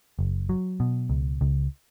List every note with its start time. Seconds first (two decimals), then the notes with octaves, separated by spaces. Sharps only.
0.19 F#1
0.49 F#3
0.80 B2
1.10 C#2
1.41 C#2